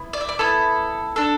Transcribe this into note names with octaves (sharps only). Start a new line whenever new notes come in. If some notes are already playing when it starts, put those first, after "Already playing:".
Already playing: B3 E4
D5
E5
D5
B3 E4 A4
D4 A4